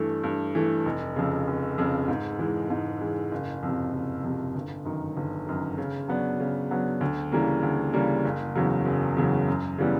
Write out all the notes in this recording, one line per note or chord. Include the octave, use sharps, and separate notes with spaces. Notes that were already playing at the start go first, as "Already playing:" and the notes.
Already playing: G2 E3 A3
G2
E3 A3
F1
F2 C#3
F1
F2 C#3
G#2
E3 G#3
G#2
E3 G#3
F#1
F2 C3
F#1
F2 C3
G1
F#2 D#3
G1
F#2 D#3
C#3
F#3 B3 D4
C#3
F#3 B3 D4
D2
C#3 E3 G3 A#3
D2
C#3 E3 G3 A#3
F#1
E2 C#3 F#3
F#1
E2 C#3 F#3
F#2
C#3 E3 G3 B3